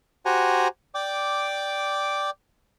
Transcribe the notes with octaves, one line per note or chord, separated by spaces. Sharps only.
F#4 G4 C5 F#5 G#5 A#5
D5 G5 D6